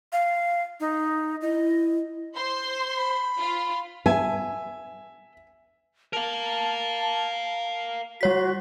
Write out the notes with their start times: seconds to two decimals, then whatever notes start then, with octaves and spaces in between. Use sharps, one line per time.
0.13 F5
0.80 D#4
1.42 E4 D#5
2.34 C5 C6
2.97 B5
3.37 F4
4.06 E5 G#5
6.13 A#4 F5 A5
8.21 G3 F#4 C#5 B6